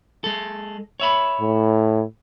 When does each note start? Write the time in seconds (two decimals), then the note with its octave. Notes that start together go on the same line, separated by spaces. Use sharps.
0.24 G#3 A4
1.00 C#5 E5 B5
1.41 A2